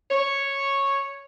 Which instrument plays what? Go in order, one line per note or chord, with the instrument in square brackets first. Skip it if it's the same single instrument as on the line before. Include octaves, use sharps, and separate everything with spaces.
[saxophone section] C#5